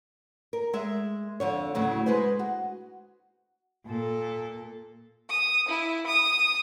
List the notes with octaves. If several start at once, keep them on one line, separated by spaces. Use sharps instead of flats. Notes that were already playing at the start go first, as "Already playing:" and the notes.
A#4
G#3 E5
F2 D3 C#5
D2 A2 C#3 F#3
G#3 G#4 B4 C5
F#4
A#2 A4
D#6
E4
D#6